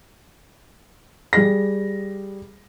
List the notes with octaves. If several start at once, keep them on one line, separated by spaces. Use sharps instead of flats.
G3 G#4 A#6